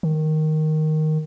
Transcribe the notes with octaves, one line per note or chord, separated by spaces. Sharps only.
D#3